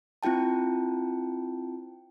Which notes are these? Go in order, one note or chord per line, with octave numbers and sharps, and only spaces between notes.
C4 E4 F4 G5 A5